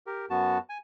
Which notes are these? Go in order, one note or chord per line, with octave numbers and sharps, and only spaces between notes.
G4 A#4
F#2 B3 F#4 A5
G#5